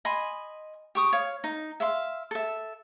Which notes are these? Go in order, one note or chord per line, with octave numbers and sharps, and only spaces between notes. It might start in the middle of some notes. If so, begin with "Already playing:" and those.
D#5 G#5 B5 C6
G4 C#6 D#6
C#5 F5
D#4
E5 F5 C6
A4 E5